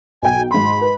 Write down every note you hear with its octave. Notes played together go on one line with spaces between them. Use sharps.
B1 G5 G#5
G#2 B5 C6
B4